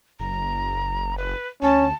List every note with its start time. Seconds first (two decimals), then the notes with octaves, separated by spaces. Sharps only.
0.20 F#1 A#5
1.18 B4
1.62 D2 C#4 A5